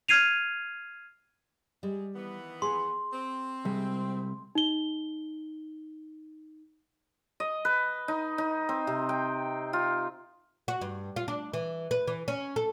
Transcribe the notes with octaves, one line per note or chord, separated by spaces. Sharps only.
F6 G#6 C7 D#7 F7
G3 G#3
D#3 E3 B3
G#4 C6
C4
C3 G3 G#3
D#4 G7
D#5
B4
D#4
D#4
C4
C3
G5
F4
F#4
G2
F4
D4
E3
B4
E3
C#4
A4